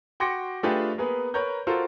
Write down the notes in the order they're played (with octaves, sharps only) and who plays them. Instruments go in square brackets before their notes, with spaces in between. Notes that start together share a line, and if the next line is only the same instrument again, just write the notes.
[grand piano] F#4 G5 C6 D6 A#6 C#7
A3 D4 F4 G4 G#4 B4
A#3 B3 G#4 B4
A#4 B4 C#5 A#5 G6
F4 F#4 A4 A#4 C5